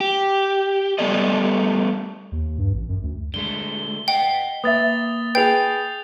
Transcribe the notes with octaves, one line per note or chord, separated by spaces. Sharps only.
G4
G3 A3 B3 A4 D5 D#5
D#2
G2
A1
F#2
D2
D3 G#3 A3 G7
D#5 F#5 G5
A#3 B4 E5 D#6 A6
G#4 B4 G5 G6 C7 F7